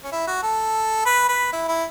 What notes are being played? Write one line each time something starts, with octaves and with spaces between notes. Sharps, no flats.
C#4
E4
F#4
A4
B4
B4
E4
E4